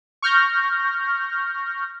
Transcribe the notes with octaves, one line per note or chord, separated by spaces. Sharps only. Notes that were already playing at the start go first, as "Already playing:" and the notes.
C#6 F6 G6 A#6